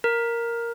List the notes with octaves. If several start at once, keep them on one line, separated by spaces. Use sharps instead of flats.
A#4